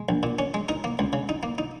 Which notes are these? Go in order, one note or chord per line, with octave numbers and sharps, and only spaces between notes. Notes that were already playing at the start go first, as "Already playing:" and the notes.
Already playing: G#3
A#1
A#2
C#4
G#3
D#4 A#4
A#3
C#2
C#3
D#4
A#3
D#4